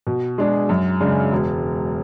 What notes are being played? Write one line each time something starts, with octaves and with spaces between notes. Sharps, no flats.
B2
G#3 D4 G#4
F#2
C#3 G#3 D4
E1